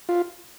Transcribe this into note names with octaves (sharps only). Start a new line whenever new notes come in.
F4